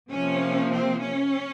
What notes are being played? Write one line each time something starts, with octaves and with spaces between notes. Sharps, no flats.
C3 F3 A#3 C#4
C4
C#4